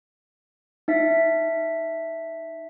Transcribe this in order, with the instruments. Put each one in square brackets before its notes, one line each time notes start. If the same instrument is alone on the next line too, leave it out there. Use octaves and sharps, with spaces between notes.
[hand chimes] D#4 E5 B6